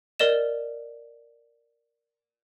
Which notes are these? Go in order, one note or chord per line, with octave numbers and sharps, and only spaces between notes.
A#4 D5 D#5 E7